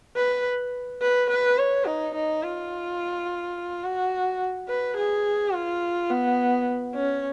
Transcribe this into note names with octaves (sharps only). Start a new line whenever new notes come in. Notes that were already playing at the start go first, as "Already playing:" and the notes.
B4
B4
B4
C#5
D#4
D#4
F4
F#4
B4
G#4
F4
B3
C#4